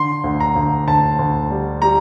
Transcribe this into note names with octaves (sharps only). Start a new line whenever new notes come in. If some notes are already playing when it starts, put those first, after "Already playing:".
Already playing: D3 C6
D2
A#5
D2
D2 A5
D2
G3
G3 A#5